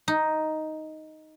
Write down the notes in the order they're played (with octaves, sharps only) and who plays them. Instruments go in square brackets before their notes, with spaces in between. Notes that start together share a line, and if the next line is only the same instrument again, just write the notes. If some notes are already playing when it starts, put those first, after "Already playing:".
[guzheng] D#4